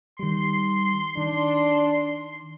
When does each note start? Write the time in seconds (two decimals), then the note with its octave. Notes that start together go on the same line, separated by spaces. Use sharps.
0.19 D#3 G3 C6
1.17 D#3 D4